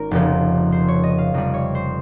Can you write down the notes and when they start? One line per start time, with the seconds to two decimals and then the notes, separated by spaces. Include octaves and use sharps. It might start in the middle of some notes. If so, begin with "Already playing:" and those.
Already playing: G#1 G#2 A#3 C#4 A#4
0.11 F1 F2 C#3 F3
0.72 C5
0.88 C#5
1.04 D#5
1.18 F5
1.34 F2 C3 G3 D#5
1.54 C#5
1.75 C5